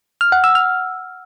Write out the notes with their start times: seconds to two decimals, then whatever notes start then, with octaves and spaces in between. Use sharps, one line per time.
0.21 F6
0.32 F#5
0.44 E6
0.55 F6